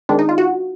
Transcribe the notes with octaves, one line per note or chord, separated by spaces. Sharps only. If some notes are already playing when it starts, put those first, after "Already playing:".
D#3 G#3 C4 D4
D#4
F4
F#4